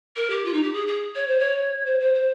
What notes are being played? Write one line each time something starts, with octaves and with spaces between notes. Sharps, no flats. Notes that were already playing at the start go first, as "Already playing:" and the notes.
A#4
G4
F4
D#4
G4
G#4
G#4
C#5
C5
C#5
C5
C5
C5